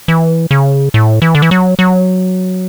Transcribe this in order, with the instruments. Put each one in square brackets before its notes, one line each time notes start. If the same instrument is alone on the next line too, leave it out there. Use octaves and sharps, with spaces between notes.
[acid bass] E3
C#3
A2
E3
D3
E3
F#3
F#3